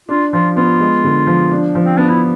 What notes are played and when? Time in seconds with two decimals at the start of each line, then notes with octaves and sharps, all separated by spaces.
0.09 D4 F4
0.33 F3 F4
0.57 B3 F4
0.80 G#3
1.04 D3
1.27 F3
1.51 D4
1.75 F3
1.85 C4
1.98 B3 D4
2.09 E4